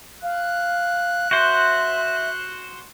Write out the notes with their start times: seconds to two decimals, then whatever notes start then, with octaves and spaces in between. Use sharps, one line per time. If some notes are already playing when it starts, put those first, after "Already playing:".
0.23 F5 F#6
1.31 F#4 C5 E5